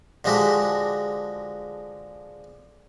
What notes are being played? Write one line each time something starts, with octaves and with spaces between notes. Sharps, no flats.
D3 F3 G#3 F#4 G4